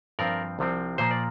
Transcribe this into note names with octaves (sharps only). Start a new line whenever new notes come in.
G2 F3 C4 A#4 D5
C2 C3 F3 C4
A#2 F3 A#3 C5
D5